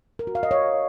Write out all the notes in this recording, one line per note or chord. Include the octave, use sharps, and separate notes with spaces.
A#4
F#4
F5
D#5
C#5